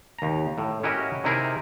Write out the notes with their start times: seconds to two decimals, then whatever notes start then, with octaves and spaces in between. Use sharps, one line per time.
0.19 D#2 A#5
0.58 A2
0.83 C#4 E4 F#4 G4 A#4 D#5
1.24 C3 D#4 E4 G#4 A#4